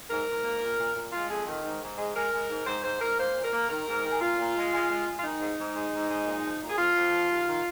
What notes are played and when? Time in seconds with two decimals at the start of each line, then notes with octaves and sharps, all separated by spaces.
0.10 G#2 A#4
0.27 G#2
0.44 A#3
0.61 A#2
0.78 A#2
0.96 A#2
1.12 G#3 F4
1.29 F2 G#4
1.47 D#3
1.64 G#2
1.81 G#2
1.98 G#3
2.16 G#3 A#4
2.32 G#3
2.50 G#2
2.67 G#2 C5
2.84 G#2 C5
3.01 G#2 A#4
3.19 A#3 C5
3.35 A#2
3.44 A#4
3.53 A#3
3.69 D#3 A#4
3.87 G#2
4.03 D#3
4.10 G#4
4.21 A#2 F4
4.38 A#2
4.56 G#3
4.72 G#3
4.89 G#3
5.07 G#3
5.19 F4
5.23 D#3 D#4
5.41 G#2
5.58 G#2
5.75 G#3
5.93 G#2
6.10 G#3
6.27 A#2
6.43 F3
6.61 A#2
6.69 G#4
6.78 F2 F4
6.95 F2
7.12 F3
7.29 D#2
7.47 D#3